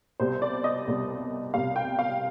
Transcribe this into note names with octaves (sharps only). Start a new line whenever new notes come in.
C2 B2 G3 C5
D5
D#5
C2 B2 G3
C2 B2 G3 F5
G5
F5